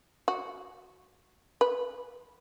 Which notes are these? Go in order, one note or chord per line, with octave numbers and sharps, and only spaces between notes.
F#4
B4